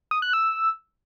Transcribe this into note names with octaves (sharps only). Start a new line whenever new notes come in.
D#6
F#6
E6